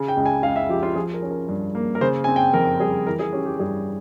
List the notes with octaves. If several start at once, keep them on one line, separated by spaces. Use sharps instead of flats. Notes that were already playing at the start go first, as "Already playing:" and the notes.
Already playing: C#3
G5
C#2
G#5
C#2 F5
E5
F3 G4
F4
F3 G#4
A#4
C#4
A#4
G2
A#3
A#4
C#3 C5
C4 G#5
G5
F2 A#4
G3 G#4
E3 A#4
G#4
C#4 G4
G4
G2 G#4